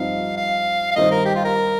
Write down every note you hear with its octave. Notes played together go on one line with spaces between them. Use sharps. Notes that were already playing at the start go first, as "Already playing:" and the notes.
Already playing: G2 F3 C4 D#4 F5
F5
F5
G2 D#3 C4 D#4 C5 D#5
A#4
G4
F4
A#4